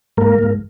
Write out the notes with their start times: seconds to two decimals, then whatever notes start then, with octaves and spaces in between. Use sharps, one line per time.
0.17 G#2 A#3 A#4
0.39 G#2